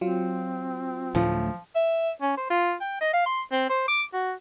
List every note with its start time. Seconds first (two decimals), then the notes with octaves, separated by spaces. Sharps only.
0.01 F#3 C4 F4
1.15 D2 A2 F3 A3
1.75 E5
2.21 C#4
2.37 C5
2.50 F4
2.81 G5
3.01 D#5
3.14 F5
3.26 C6
3.52 C4
3.70 C5
3.88 D6
4.13 F#4